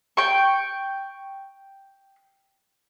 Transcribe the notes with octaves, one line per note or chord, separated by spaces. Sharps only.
G5 C#6